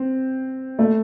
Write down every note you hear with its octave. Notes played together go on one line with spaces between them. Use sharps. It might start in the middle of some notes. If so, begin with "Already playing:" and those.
Already playing: C4
A3